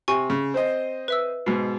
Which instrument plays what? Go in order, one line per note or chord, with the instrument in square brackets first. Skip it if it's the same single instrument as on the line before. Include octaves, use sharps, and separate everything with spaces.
[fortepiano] C3 [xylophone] G#5 C#6
[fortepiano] C#3
C4 C5 D#5
[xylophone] B4 E5 E6
[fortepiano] G#2 B2